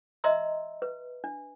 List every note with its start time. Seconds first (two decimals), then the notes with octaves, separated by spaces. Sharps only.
0.24 D#5 E5 A#5 C6 E6
0.82 B4
1.24 D4